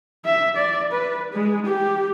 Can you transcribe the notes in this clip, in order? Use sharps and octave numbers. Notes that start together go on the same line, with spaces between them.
E5
D5
B4
G#3
G4